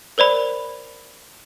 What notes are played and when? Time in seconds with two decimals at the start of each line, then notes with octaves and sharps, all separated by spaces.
0.18 A#4 C5 D5 B5